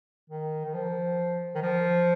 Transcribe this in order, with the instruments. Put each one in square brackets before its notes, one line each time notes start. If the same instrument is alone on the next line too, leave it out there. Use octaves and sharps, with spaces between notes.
[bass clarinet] D#3
D#3
F3
D#3
F3